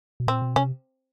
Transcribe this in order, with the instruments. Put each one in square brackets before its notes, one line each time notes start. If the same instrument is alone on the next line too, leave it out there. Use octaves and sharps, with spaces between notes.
[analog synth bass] B2
[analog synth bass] A#2 [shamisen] C4
[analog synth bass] B2
[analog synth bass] C3 [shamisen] C#4